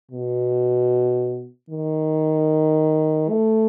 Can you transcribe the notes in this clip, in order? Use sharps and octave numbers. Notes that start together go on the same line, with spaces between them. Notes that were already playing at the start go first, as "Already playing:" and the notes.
B2
D#3
A3